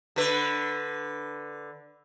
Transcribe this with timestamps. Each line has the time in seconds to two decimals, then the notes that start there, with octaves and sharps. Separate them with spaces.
0.16 D3 B4